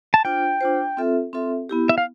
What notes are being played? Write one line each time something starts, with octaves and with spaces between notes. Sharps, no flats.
A5
D4 F4 C5 G5
D4 F4 C5
C4 F4 A4 E5
C4 F4 A4 E5
B3 E4 G4
E5
F5